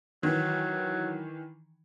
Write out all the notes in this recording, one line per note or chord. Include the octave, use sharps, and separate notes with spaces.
D#3 E3 F#3